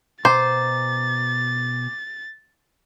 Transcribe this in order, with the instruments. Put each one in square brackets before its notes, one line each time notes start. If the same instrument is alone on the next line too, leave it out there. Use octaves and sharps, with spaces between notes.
[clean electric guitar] B2 G#5 A#5 [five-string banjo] C5 [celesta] D6 [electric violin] A6